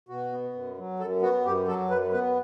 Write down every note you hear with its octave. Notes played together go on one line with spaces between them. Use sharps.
B2 F#4
B3
F#2
F#3
F#2 A4
B3 F#4
F#2 G4
F#3 A4
F#2 B4
B3 B4